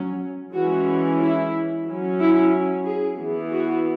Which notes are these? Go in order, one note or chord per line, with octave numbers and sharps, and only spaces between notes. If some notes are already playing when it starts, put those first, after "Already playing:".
Already playing: F#3 C#4
E3 G#3 C#4 F#4
E4
F#3 C#4
E4
G#4
E3 B3
F#4